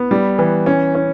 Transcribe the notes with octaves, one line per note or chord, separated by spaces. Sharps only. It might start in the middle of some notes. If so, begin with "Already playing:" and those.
Already playing: B3
G3
E3
C#4
C#4